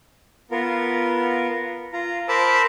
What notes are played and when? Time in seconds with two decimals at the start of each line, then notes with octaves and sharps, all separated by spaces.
0.51 B3 F4 A#4
1.93 F4 A#5
2.28 A#4 C5 A5 B5 D6 E6